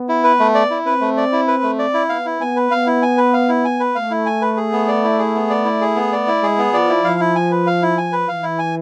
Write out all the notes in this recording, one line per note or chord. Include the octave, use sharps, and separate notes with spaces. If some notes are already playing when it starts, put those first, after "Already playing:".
Already playing: B3
E4
B4
A3
D5
E4
C4 B4
A3
D5
E4
B4
A3
D5
E4
B3 F5
E4
B3 G#5
B4
B3 F5
E4
G#5
B4
F5
E4
G#5
B4
A3 F5
E4
G#5
B4
G#4
B3
D5
E4
G#4
B3
D5
E4
G#4
B3
D5
E4
G#3 G#4
B3
F3 D5
E4
F3 F5
E4
G#5
B4
F5
E4
G#5
B4
E3 F5
E4
G#5